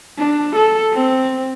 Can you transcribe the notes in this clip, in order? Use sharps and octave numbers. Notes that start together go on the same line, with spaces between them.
D4
A4
C4